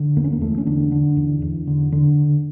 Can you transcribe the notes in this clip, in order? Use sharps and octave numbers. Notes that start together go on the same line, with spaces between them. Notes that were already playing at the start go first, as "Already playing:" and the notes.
Already playing: D3
E2 A#3
C#4
A#3
E2 A3
C#4
D3 D4
D3
E2
E2
D3
D3